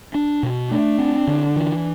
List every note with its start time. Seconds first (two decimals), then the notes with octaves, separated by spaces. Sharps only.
0.14 D4
0.43 B2
0.71 A3 D4
0.99 C4
1.27 D3
1.56 E3